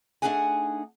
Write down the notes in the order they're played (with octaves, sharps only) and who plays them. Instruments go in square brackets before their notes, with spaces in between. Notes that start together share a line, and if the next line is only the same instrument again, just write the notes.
[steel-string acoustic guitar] A3 D4 D#4 G#4 F#5 G#5